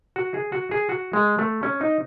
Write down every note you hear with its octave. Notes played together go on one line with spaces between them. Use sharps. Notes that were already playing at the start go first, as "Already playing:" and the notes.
F#4
G#4
F#4
G#4
F#4
G#3
A3
C#4
D#4